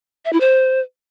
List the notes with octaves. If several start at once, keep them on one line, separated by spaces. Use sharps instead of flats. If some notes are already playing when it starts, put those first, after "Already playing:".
E5
E4
C5